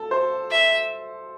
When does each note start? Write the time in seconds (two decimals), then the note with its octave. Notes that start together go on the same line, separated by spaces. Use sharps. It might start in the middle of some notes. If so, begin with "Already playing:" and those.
Already playing: A4
0.11 C5
0.51 E5